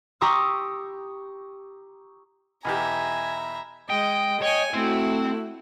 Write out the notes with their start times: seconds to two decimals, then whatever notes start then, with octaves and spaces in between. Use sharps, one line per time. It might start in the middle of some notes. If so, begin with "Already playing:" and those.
0.21 G4 A#5 C6 C#6 D#6 E6
2.65 B1 E2 G4 E5 G#5 A#5 B5
3.90 G#3 D#5 G5
4.42 C#5 D#5 G5 G#5
4.74 A3 C4 E4 F#4 C5